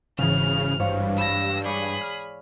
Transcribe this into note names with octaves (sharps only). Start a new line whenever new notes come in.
G#1 C#3 E3 F6
G2 C5 C#5 F5
A5 B5 E6 A#6
G#4 C#5 D5 B5
F6